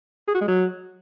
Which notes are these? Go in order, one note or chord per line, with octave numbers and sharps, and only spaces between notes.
G#4
F#4
G#3
F#3